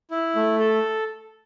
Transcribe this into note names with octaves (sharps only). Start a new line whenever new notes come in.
E4
A3
A4